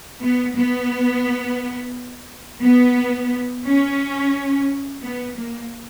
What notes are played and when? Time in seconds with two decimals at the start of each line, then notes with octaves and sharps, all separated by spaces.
0.22 B3
0.56 B3
2.62 B3
3.65 C#4
5.02 B3
5.37 A#3